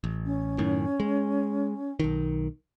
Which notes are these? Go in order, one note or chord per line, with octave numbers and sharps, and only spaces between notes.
A1
C#4
F#2 A2 D#3
G#3
B1 D#3